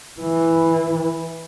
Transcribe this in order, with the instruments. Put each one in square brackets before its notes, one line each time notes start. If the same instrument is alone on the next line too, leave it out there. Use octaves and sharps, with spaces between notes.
[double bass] E3